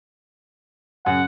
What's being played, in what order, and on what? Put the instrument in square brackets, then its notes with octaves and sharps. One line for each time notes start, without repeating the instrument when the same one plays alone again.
[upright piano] F#2 C#3 [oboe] F#5